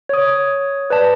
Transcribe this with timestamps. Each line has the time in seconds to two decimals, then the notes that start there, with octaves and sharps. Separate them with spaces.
0.09 C#5 D#6
0.90 B4 D5 A5